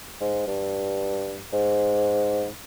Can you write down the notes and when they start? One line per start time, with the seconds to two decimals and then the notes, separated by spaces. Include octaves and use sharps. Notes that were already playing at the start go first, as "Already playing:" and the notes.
0.21 G#2
0.47 G2
1.53 G#2